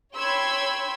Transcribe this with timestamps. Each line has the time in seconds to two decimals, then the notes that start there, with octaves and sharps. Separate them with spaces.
0.14 C#5 G5 B5 C6 E6 G#6